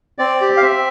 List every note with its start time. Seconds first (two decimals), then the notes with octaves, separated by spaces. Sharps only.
0.18 C4 D5
0.41 G4
0.57 F5
0.62 C4 E5